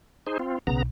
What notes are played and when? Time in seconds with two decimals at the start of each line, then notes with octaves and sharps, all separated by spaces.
0.27 D#4 G#4 C5
0.39 C4 F4
0.67 B1 C#3 B3 A#5